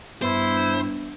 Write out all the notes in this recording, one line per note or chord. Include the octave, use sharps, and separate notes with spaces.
G2 B3 E4 C5